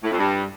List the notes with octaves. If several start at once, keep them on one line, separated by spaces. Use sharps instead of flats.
A2
F2
G2